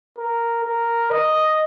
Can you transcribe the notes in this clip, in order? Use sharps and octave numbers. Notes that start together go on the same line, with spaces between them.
A#4
A#4
D#5